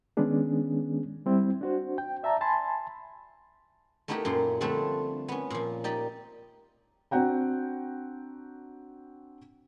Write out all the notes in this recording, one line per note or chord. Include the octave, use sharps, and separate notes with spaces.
D#3 G#3 B3 C#4 D4 G#4
G3 C4 E4
D4 F#4 C5
G5
D5 E5 A5 A#5
G#5 A5 B5 C6
A3 B3 D#4 E4 G4 A#4
F#2 A#2 C6
D3 F3 G3 A3 C4 D4
B3 C#4
A#2 F3
D#4 G4 D5
C4 D4 F#4 F#5 G5 A#5